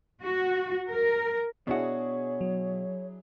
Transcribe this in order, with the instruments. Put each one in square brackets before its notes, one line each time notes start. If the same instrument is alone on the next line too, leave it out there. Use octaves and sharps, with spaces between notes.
[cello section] F#4
A#4
[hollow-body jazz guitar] B2 F#4 [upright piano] D4 E4 G#4 [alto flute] C#5
[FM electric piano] F#3